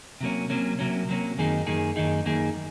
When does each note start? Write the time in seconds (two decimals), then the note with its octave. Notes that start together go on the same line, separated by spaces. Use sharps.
0.21 C3 F#3 A#3 C#4
0.50 C3 F#3 A#3 C#4
0.79 C3 F#3 A#3 C#4
1.09 C3 F#3 A#3 C#4
1.38 F#2 D#3 A#3 D#4 G#4
1.67 F#2 D#3 A#3 D#4 G#4
1.96 F#2 D#3 A#3 D#4 G#4
2.26 F#2 D#3 A#3 D#4 G#4